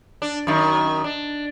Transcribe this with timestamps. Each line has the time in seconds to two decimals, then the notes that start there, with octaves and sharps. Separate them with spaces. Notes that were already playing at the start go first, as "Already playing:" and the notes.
0.22 D4
0.47 F#2 D#3
1.04 D4